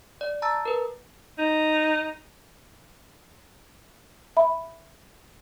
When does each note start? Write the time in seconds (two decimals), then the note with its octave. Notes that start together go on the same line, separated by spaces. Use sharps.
0.21 D5
0.42 A5 A#5 E6 A6
0.66 A#4 B4
1.38 D#4
4.37 E5 B5